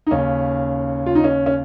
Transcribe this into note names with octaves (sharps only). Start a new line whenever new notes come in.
D#4
D#2 C#3 C#4
F4
D#4
C#4
C#4